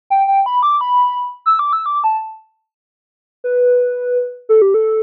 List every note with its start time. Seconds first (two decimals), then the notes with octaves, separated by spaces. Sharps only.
0.10 G5
0.28 G5
0.46 B5
0.63 D6
0.81 B5
1.46 E6
1.59 D6
1.73 E6
1.86 D6
2.04 A5
3.44 B4
4.49 A4
4.62 G4
4.74 A4